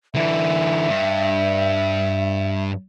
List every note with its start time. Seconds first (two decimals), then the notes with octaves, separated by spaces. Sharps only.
0.15 D3 E3 E5
0.89 G2